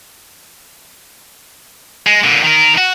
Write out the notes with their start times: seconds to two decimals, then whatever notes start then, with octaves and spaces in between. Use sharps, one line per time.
2.07 G#3
2.24 A#2 D3
2.43 D#3 A#4
2.77 F#4